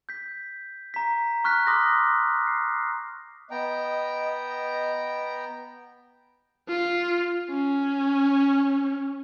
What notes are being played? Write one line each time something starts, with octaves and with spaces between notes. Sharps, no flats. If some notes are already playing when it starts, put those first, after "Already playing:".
G6 B6
A#5 B6
C#6 F6 F#6 B6
C6 D6 D#6 F#6 A#6
C7
B3 D#5 G5 A#5
F4
C#4